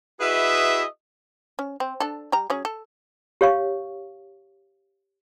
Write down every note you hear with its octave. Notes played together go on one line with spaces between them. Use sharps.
E4 F#4 G#4 B4 D#5 E5
C#4
C4
D4 A4
G3 G5 A#5
F#3 C#4 G#4
A4
G4 C#5 F5 C#6